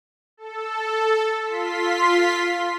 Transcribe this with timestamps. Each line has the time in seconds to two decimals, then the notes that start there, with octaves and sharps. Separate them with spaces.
0.37 A4
1.44 F4 C6 B6